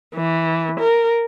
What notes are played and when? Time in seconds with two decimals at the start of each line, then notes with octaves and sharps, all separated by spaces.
0.16 E3
0.80 A#4